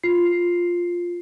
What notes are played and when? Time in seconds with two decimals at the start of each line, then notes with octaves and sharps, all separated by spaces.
0.03 F4 C7